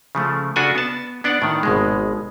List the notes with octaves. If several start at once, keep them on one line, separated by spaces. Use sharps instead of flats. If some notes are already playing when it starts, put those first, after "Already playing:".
C#3 F3 A3
C#3 D4 F#4 A4 F#5 G#5
B3 A5
B3 D4 D5 F#5
A2 D#3
G#1 B2 G#3